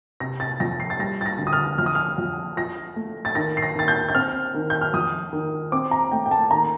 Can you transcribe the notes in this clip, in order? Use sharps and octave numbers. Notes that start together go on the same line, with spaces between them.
C3 A#6
A6
F2 A#6
C7
A6
G3 A#6
A6
A#6
D2
D#6
F6
F2 F6
D#6
F6
F2
F3 A#6
A3
A6
D#3 A#6
C7
A#6
D#2 A6
G6
G6
C4 F6
D#3
G6
F6
F2 D#6
D#3
C4 D6
A#5
A3 G5
G5
A5
D#2 A#5